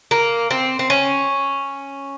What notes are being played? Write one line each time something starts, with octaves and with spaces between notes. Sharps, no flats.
A#3
C4
C4
C#4